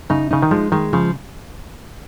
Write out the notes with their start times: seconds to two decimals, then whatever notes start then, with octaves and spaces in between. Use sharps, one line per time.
0.10 C#3 D#4
0.31 C#3 D#4
0.42 D#3
0.51 F3 G#3
0.72 D#3 G#3
0.93 C#3 F3